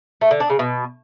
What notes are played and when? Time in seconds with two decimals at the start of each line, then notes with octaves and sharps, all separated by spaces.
0.21 A3
0.31 D3
0.40 D4
0.50 C#3
0.59 B2